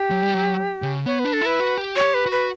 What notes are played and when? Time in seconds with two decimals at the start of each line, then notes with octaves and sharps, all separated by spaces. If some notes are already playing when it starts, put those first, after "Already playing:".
Already playing: G4
0.11 F#3
0.23 G3
0.34 F#3
0.82 C#3
1.06 B3 C#5
1.19 B4
1.25 D4
1.33 A4
1.41 E4 B4
1.60 F#4
1.78 G4
1.96 F#4 C#5
2.01 G4
2.14 B4
2.26 F#4
2.31 B4